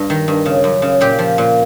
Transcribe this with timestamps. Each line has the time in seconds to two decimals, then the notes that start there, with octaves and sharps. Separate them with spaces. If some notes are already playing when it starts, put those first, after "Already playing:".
Already playing: G2
0.10 D#3
0.28 G2
0.46 C#3
0.64 F#2
0.82 C#3
1.01 A#2 G4
1.19 F3
1.38 A#2